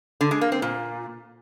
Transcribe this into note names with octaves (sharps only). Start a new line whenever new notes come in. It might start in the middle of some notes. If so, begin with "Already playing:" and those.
D3
G#3
A#3
C4
A#2